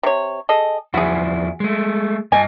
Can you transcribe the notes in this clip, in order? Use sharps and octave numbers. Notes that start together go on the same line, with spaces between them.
C3 C#5
G#4 A4 D#5
E2 F3 E4 F#4 G#4
G#3 A3
G2 D#5 G#5 A5